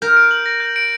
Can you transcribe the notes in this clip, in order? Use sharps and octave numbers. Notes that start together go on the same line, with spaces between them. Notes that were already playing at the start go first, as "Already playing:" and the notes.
A#4 G6
D7
F#7
A#6
G6
D7